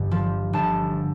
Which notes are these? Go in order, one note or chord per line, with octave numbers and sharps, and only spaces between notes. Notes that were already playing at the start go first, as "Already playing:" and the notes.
Already playing: G1 G2
F3
G1 A5